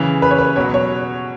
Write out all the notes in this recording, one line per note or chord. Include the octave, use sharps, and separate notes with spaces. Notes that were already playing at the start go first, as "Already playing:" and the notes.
Already playing: C#3 E3
B4
C#5
B4
B2 F#3 C#5
C#5